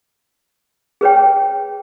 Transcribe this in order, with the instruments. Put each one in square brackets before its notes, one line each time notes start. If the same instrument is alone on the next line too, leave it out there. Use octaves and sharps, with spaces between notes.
[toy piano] G#4 B4 C#5 G5